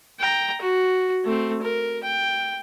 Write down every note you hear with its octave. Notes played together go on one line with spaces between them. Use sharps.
G5 A#5
F#4
A3 C4
A#4
G5